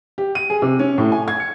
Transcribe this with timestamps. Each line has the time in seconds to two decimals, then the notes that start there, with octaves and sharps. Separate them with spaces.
0.18 G4
0.35 D#7
0.50 G#4
0.62 C3
0.79 C#4
0.98 A2
1.12 G#5
1.28 G#6
1.40 C#7